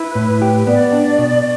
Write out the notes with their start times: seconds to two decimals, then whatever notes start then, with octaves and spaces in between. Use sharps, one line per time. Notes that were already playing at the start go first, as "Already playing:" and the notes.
Already playing: E4 B4
0.15 A2
0.42 G4
0.67 B3 D5
0.93 D4
1.18 B2